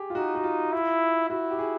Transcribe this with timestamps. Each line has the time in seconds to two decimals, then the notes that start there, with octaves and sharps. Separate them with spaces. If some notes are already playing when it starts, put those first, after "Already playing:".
Already playing: G4 G#4
0.10 F4
0.15 D#4 F#4
0.35 F#4
0.44 F4
0.73 E4
1.29 E4 F#4
1.51 G4
1.59 G#4